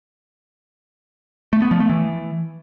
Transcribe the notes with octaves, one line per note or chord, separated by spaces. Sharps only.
A3
B3
F3
A3
E3